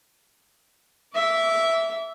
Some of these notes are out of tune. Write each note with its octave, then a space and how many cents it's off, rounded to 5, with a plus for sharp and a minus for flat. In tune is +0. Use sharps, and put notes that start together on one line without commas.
E5 +0 D6 -30